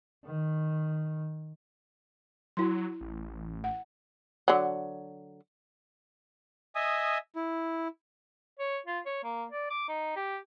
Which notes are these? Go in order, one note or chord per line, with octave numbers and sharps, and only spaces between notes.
D#3
F#3 E4 C6
A1
F#5
D3 F#3
D#5 E5 G#5 D#6
E4
C#5
F4
C#5
A#3
D5
D6
D#4
G4